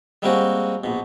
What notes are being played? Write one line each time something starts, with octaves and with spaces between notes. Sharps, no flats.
G3 G#3 A#3 C4 F#4 G#4
A#1 B2